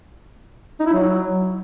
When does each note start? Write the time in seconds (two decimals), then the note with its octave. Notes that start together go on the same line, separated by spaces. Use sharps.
0.80 D#4
0.87 E4
0.93 F#3